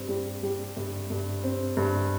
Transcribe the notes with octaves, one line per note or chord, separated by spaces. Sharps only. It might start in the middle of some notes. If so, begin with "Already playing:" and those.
Already playing: G2 C4
G3
G3
G2
G2
C4
G2